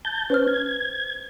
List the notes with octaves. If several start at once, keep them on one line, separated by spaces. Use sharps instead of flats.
A5 G6
C#4 B4 C5 F6
G#6